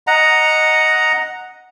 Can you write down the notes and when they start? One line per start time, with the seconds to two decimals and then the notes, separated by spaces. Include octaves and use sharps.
0.07 D#5 F#5 A#5